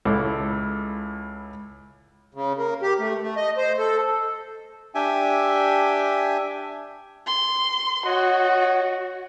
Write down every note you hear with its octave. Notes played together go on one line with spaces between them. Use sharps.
C#2 E4 A4 D6
C#3
A#3
G4
A3
A3
D#5
C5
A4
D4 G4 E5 G5 G#5
C6
F#4 C#5 D#5 F#5